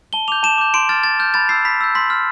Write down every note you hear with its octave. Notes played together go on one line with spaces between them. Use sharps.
A5 G7
D6 G6 F7
A5 E7
D6 G6
C6 D7
F6 A6
C6 A6
F6 G6
B5 A6
E6 G6 C7
B5 B6
E6 G6
C6 B6
F6